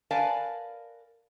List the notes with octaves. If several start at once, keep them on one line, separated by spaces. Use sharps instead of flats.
A#4 B4 D5 F5 G#5 A5